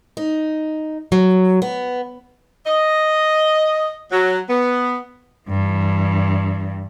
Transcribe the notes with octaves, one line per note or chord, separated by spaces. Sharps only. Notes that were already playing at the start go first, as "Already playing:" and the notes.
D#4
F#3
B3
D#5
F#3
B3
G2 E3